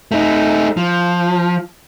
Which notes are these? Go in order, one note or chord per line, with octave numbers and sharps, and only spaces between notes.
A3 D#4
F3